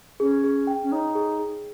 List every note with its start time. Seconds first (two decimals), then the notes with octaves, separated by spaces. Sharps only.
0.20 C#4 G#4
0.44 G#4
0.67 G5
0.83 C#4
0.92 D#4 C#5
1.15 G#4
1.39 G#4